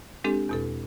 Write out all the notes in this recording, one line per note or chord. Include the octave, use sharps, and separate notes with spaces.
G#3 C4 D4 G4 A4
E2 B2 A4